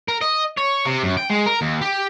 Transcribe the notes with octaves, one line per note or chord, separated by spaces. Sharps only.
A#4
D#5
C#5
C3
F#2
G5
G#3
A#4
D#2
G4